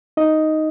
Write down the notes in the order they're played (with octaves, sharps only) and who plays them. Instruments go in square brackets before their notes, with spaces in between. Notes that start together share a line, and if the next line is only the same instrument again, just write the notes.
[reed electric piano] D#4 D#5